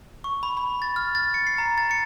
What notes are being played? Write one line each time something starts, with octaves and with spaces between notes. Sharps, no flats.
C#6
B5
B5
A6
F6
A6
C#7
C7
A#5
A6
C#7